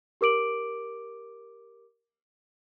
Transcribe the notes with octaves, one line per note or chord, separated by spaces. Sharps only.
G4 A#4 D6 D7 F#7